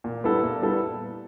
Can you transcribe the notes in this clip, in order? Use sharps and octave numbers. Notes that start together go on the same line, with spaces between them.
A#2
G3 B3 E4 A4
A#2
G3 B3 E4 A4